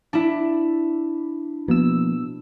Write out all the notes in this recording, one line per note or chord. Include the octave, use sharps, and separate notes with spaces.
D4 E4
B2 F3 A#3 E6